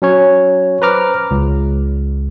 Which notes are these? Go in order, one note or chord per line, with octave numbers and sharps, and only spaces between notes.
F#3 C#4 C#5
B4 C5 A#5 D6 F6
C#2